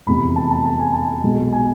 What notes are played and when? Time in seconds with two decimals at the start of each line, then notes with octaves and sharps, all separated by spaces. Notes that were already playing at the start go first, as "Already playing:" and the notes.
0.07 F1 E2 C3 B5
0.36 A5
0.51 A5
0.65 A5
0.79 G#5
0.94 A5
1.23 B1 B2 G#3
1.52 G#5